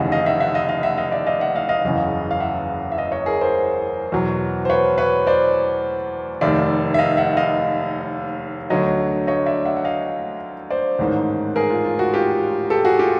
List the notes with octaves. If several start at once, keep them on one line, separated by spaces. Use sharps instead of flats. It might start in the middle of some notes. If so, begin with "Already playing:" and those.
Already playing: F1 D#2 C#3 E3 D#5 F5 F#5
D#5 F5
E5 F#5
E5 F#5
D#5 F5
D#5 F5
E5 F#5
D#5 F5
D5 E5
D#5 F5
E5 F#5
D#5 F5
D#5 F5
F#1 E2 C#3
F5
E5 F#5
E5
D#5 F5
C#5 D#5
G#4 A#4
A#4 C5
E2 B2 F#3
C5
B4 C#5
B4 C#5
C5 D5
F1 D#2 D#3 D5 E5
E5
D#5 F5
E5 F#5
D#5 F5
D2 D3 F#3 C#5 D#5
C#5 D#5
D5 E5
E5 F#5
F#5
D#5 F5
C5 D5
A1 G#2 D#3
G#4 A#4
F4
F4
F#4
F4 G4
G4 A4
F#4 G#4
F4 G4